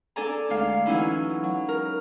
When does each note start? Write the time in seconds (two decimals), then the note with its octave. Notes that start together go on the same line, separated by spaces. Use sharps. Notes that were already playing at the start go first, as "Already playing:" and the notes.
0.16 D4 A4 D5 G#5 A#5
0.50 D2 G#3 D4 F5
0.86 E3 F#3 C#4 D#4 E4
1.43 F#3
1.69 A#4